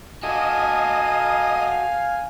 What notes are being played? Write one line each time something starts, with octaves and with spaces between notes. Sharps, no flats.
F#4 A4 D#5 F5 G#5